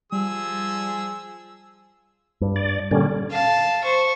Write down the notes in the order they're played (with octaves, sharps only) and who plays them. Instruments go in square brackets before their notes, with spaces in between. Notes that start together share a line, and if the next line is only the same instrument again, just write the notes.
[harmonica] F3 G#4 E6 [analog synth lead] G3
[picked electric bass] G2
[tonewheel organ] D5
[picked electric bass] A#2 [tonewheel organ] D3 G3 C#4
[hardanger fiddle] F5 A5
C5 C#6